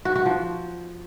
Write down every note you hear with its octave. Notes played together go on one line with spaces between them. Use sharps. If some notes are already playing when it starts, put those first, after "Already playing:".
F#4
F#4
F3